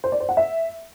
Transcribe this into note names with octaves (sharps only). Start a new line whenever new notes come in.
C5
D5
C5
F#5
E5